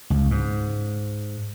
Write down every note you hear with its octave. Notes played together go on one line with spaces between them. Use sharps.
C#2
G#2